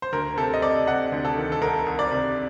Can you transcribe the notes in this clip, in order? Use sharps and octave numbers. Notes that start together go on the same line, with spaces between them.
C5
D2 A#4
C3 A4
D#5
C3 D5
C3 F#5
D2
A4
D#3
A4
C2 A#4
C2
D5
C3